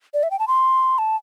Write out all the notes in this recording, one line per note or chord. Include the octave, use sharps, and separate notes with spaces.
D5
E5
G5
A5
C6
A5